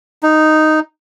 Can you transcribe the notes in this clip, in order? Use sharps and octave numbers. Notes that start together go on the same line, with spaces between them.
D#4